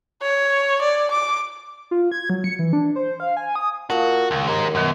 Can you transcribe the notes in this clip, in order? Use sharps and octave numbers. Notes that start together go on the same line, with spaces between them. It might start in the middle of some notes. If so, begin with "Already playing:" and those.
C#5
D5
D6
F4
G#6
F#3
C#7
E3
D4
C5
F5
G#5
D#6
A#2 F#4 F5 A5
C#2 D#3
D#2 G#3 D#4
F#2 B2 D#3 B3